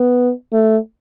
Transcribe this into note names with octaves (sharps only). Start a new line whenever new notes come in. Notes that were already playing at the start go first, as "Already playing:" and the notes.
Already playing: B3
A3